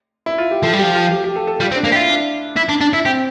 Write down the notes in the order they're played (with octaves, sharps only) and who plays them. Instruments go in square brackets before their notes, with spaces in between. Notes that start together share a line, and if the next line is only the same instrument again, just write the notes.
[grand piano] E4
F4
G4
[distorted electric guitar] F3 [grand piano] A4
[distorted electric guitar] G3
[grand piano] G4
[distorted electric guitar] F3
[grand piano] F4
G4
G4
A4
A4
[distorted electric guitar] G3 [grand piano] F4
[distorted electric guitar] C4
[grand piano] D4
[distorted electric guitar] A#3
[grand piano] E4 [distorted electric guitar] G4
[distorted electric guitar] F4
[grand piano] D4
[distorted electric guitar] E4
D4
D4
E4
[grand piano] C4 [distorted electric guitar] G4